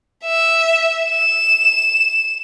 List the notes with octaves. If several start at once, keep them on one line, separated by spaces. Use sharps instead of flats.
E5
E7